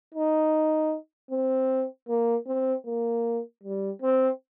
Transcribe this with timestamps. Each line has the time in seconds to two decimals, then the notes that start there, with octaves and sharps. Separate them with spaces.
0.14 D#4
1.31 C4
2.09 A#3
2.47 C4
2.86 A#3
3.63 G3
4.02 C4